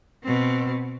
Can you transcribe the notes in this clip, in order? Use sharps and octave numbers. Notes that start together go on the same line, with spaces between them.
B2 C4